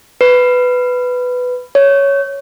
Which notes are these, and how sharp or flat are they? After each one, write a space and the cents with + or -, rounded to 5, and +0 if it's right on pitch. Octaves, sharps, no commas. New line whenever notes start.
B4 +10
C#5 +5